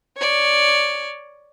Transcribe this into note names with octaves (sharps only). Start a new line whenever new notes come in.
C#5 D5